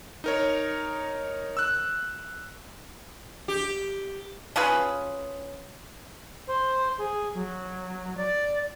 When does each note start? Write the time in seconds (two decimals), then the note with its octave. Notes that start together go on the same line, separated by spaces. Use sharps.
0.24 D#4 A#4 C#5
1.57 E6 F#6
3.48 G4
4.56 C#4 F4 G#4 B4
6.48 C5
6.98 G#4
7.34 F#3
8.17 D5